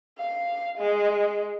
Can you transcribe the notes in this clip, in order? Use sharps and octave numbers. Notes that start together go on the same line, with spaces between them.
F5
G#3